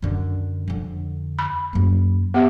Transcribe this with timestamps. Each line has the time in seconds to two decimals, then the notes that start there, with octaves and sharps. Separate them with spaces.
0.02 F#2 D3
0.68 F2 D3
1.39 B5
1.73 F#2 A#3
2.34 B3 G4 E5